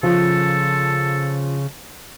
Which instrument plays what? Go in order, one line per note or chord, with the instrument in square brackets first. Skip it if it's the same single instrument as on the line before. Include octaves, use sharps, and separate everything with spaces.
[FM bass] C#3 [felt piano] F3 [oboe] A4